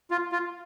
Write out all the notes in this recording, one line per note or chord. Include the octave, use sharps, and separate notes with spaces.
F4
F4